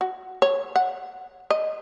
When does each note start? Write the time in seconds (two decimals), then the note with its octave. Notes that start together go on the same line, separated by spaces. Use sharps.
0.01 F#4
0.42 C#5
0.76 F#5
1.50 D#5